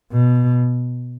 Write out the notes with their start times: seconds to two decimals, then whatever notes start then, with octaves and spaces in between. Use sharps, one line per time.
0.12 B2